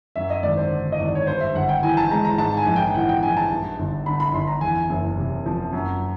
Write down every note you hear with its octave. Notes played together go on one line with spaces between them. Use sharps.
F#2 E5
D#5
G#1 D5
C5
D3
D#5
G#1 D5
C#5
G2 C5
E5
G1 F#5
G5
E3 G#5
A5
G#3 A#5
A#5
G#2 A5
G#5
A#1
G5
E3 F#5
G5
A#1 G#5
A5
G2
G1
D3 B5
B5
G1 C6
A#5
E2 G#5
F#1
C3
F3
F#2